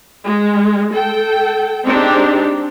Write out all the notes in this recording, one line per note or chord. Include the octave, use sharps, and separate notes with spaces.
G#3
A4 G5
G#3 C4 D4 D#4 G4